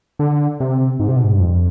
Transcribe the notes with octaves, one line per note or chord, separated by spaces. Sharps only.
D3
C3
G#2
C3
B2
G#2
G2
F2